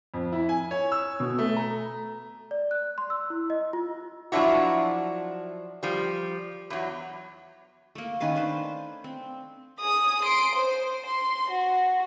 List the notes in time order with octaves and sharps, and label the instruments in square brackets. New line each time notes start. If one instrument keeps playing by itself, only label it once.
[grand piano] F2
E4
G#5
C#5
E6
B2
A3
A#5
[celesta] D5
F#6
C6
E6
E4
D#5
F4
[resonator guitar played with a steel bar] F3 F#3 D4 E4 F#4
F3 G3
E2 F#3
[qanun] A3 A#3
D#3 C#4 B4 F5
D4 B4 C5
C4
[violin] G#4 D#6
C6 D7
C5
C6
F#4